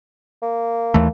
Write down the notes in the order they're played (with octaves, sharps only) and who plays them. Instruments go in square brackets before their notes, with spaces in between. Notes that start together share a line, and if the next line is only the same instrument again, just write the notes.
[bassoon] A#3
[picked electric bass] D#2 E3 A3